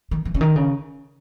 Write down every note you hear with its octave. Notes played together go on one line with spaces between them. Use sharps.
D#3
E3
C#3
D#3
C#3